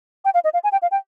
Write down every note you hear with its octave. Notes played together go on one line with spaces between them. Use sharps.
G5
F5
D#5
F5
G#5
G5
F5
G5